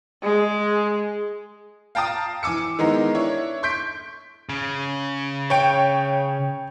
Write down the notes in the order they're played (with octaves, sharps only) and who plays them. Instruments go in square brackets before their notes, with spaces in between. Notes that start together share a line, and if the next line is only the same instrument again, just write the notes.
[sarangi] G#3
[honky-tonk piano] F5 G5 A5 A#5 D#6
E3 G#5 D6 E6 C#7
D#3 E3 G#3 B3 D#4 A#4
D4 E4 C#5
C6 C#6 G6 B6 D7
[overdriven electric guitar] C#3
[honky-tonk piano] C#5 G5